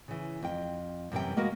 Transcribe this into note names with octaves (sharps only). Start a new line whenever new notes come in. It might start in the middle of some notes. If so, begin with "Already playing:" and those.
C#3 E3
F2 G5
F#2 C3 E3 G3 G4 G5
G#3 A#3 B3 F#4 A#4